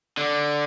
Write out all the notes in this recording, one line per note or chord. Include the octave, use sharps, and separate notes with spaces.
D3